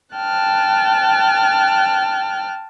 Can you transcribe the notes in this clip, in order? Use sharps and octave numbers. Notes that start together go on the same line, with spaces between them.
G5 A5 F6 F#6